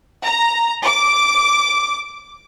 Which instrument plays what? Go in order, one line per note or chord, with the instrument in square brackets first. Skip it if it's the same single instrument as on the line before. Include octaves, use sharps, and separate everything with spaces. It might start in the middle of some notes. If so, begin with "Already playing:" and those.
[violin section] A#5
D6